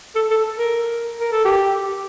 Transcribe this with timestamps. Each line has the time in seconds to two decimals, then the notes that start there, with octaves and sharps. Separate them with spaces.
0.16 A4
0.31 A4
0.58 A#4
1.20 A#4
1.32 A4
1.45 G4